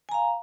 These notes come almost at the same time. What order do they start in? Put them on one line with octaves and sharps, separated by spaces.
G#5 A#5 F5